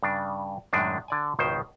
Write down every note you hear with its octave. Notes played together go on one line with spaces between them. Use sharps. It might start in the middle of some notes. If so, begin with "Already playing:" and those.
G2 C#3 D4
F#2 A2 D#3 G#3 D4
D3 D5 G#5
G#1 C#2 B2 D#3 C5